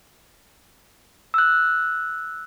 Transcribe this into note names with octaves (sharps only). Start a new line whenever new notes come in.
E6 F#6